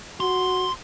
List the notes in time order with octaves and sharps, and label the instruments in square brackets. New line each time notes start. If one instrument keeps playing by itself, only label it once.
[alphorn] F#4 [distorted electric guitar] C6